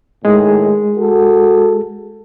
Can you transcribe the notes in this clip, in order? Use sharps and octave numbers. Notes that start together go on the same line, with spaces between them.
A2 D#3 G#3 G#4
F#4 A4